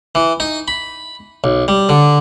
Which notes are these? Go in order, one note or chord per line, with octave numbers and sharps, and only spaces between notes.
E3
D#4
B5
B1
G3
D3